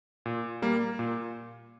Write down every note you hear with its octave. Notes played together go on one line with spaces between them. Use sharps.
A#2
G3 A#3
A#2